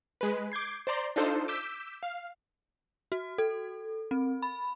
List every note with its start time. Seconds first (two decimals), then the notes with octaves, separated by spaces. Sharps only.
0.21 G#3 B4
0.52 D6 G6 G#6 C7
0.87 C5 D5 A#5 C6
1.16 D4 D#4 F4 A4 C5
1.48 D6 E6 G6 B6 E7
2.03 F5
3.12 F#4
3.38 A4
4.11 C4
4.42 B5